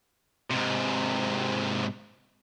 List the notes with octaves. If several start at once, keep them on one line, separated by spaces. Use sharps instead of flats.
G#2 C3